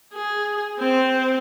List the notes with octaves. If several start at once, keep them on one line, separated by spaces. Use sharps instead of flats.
G#4
C4 C5